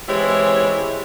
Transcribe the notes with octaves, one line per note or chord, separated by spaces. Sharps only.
E3 G#3 C4 E4 G4 C#5